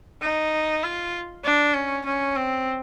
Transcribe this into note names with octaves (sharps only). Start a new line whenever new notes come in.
D#4
F4
D4
C#4
C#4
C4